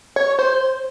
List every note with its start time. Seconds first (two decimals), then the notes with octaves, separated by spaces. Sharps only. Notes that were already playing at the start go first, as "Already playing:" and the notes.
0.16 C#5
0.39 C5